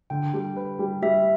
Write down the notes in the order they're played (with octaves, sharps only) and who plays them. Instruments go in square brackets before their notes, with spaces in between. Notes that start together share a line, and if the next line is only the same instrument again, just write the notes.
[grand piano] D3 [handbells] G5
[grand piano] G3
B4
G3
[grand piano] G3 [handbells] E5